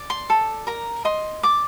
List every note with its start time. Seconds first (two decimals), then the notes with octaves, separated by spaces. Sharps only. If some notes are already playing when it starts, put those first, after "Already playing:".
Already playing: D5
0.10 C6
0.30 A4
0.67 A#4 A#5
1.05 D#5 C6
1.43 D5 D6